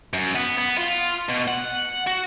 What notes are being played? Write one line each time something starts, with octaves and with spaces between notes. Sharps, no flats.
F#2
B3
B3
F4
B2
F#5
F#4